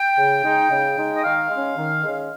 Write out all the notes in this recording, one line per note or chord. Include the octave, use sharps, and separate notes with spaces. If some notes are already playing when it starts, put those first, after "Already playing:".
Already playing: G5
C#3
G#3 D#4
C#3
G#3 D#4
D#5
D#3 F5
G#3 C#4
D#3
G#3 C#4